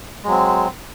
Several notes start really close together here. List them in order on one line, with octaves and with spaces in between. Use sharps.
G#3 F#3 C4